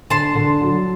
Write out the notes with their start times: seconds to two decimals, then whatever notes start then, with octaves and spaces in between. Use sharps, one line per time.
0.10 D3 A5 C6
0.35 D3
0.61 F#3